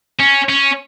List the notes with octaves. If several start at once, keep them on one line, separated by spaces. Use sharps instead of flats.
C#4
C#4